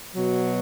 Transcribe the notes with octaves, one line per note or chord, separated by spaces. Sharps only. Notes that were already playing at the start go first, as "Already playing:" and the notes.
B2 F#3